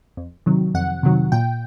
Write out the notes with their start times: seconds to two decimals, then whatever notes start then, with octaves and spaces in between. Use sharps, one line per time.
0.17 F2
0.46 C3 D#3 F#3
0.74 F2 F#5
1.03 C3 D#3 F#3
1.32 A#2 G5